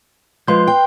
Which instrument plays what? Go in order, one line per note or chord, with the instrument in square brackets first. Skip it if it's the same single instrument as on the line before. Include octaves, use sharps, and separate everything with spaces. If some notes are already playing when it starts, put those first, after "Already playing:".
[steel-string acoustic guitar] F3 G#3 [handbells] B4 C6 G6
[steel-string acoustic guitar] G5